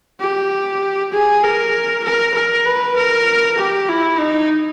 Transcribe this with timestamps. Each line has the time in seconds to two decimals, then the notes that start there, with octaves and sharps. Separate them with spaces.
0.20 G4
1.13 G#4
1.43 A#4
2.04 A#4
2.35 A#4
2.66 B4
2.96 A#4
3.58 G4
3.89 E4
4.18 D#4